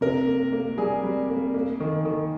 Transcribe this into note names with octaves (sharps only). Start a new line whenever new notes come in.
C3 A#4
A#3
A#3
G3 G#4
G3
A#3
A#3
D#3
D#3